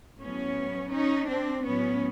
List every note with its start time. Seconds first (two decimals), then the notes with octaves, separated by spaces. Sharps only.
0.20 A2 F#3 B3 C#4
0.93 C#4 D#4
1.28 C4 D4
1.64 A2 F#3 B3 C#4